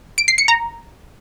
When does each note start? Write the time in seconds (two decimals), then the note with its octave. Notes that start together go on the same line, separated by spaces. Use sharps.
0.18 D7
0.28 C7
0.38 C#7
0.48 A#5